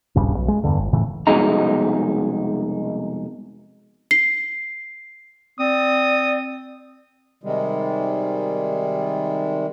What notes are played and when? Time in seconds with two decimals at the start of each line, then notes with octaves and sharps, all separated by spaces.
0.16 D#1 B1 G2 C#3
0.36 B1
0.48 G#3
0.64 E2 G2 D3
0.79 G1
0.93 F1 A2 C#3 E3
1.27 C2 F2 B2 G#3 D#4 A#5
4.11 C7
5.59 C4 D5 D#6
7.44 C3 D#3 G3 G#3